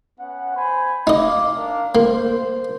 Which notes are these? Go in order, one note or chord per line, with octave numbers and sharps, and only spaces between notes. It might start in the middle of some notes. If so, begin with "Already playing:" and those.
B3 C#4 F#5
C5 G#5 B5
D#4 D#5 F5 D6
D4 A#4 F5
A#3 C5